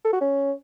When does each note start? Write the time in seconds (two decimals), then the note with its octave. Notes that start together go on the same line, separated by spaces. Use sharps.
0.05 A4
0.13 F#4
0.21 C#4